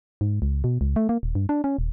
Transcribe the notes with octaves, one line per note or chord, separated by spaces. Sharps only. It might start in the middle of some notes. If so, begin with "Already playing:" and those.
G#2
C#2
B2
C#2
A3
A#3
D#1
G2
D4
C#4
D#1